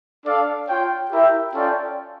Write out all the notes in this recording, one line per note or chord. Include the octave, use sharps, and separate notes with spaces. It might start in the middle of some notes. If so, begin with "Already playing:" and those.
D4 A4 D5 F5
F4 C#5 G5
E4 G4 A#4 E5 G5
C#4 F4 A4 D5 G5